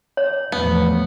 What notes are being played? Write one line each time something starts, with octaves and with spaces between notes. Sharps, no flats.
C#5
E2 A2 F3 B3